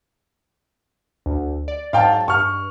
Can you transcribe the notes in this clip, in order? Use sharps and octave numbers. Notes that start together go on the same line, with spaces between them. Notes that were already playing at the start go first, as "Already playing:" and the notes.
D2
D5
G#2 F#3 F5 G5 A5 A6
G2 C#6 F6